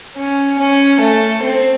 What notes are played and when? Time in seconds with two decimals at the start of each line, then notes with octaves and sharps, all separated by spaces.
0.16 C#4
0.59 C#4
1.00 A3
1.42 C4